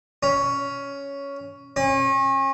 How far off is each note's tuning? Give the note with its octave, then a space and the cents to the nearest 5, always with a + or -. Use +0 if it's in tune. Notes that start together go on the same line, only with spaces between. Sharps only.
C#4 +10
C#4 -35